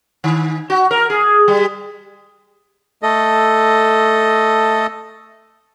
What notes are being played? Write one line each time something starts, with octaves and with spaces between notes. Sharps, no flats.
D#3
F#4
A#4
G#4
G3
A3 A4 D#5